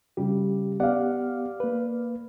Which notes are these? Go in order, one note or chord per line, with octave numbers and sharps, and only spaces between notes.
C#3 G3 G4
B3 G4 D5 F5 F#5
A#3 B4